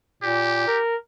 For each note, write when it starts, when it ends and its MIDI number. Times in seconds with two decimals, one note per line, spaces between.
0.23 0.65 46
0.23 0.79 67
0.67 0.96 70